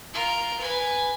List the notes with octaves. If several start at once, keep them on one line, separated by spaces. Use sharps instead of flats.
F4 A#4
B4 G#5